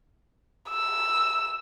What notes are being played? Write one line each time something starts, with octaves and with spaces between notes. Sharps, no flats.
E6